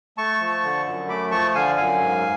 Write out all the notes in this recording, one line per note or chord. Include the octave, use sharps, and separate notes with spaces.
A3 A5 C#6
F3
D3
F#2
A3 B5 D6
F3 A5 C#6
D3 F5 G#5
F#2 F5 G#5
G#2